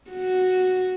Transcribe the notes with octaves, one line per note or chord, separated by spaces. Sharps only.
F#4